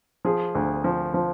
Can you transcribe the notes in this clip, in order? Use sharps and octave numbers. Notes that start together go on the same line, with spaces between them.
F3 G#4
D2
F3
F3